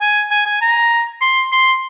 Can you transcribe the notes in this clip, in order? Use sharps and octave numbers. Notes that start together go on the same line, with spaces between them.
G#5
G#5
G#5
A#5
C6
C6